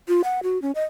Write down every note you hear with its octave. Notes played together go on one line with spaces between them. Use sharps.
F4
F#5
F#4
C#4
D#5